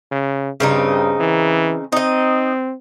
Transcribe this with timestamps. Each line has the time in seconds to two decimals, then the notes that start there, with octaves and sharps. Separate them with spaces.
0.11 C#3
0.60 G2 C#3 C4 D#4
1.20 E3
1.92 C4 D#4 D#5